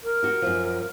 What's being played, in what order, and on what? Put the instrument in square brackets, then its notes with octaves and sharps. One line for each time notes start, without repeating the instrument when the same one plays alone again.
[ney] A#4
[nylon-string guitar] F#4 G4
F#2 F3